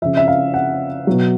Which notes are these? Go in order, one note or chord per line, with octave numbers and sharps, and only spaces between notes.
C#3 F3 E5
E5
F5
F#5
B2 F#3